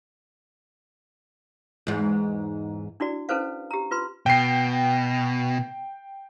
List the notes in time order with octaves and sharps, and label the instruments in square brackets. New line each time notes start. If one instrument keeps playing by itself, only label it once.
[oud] E2 G#2
[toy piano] D4 E4 F#4 D5
C#4 E4 A4 B4 C5 F5
G4 A#5
F4 B4 C6
[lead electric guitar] B2 [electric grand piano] G5 C7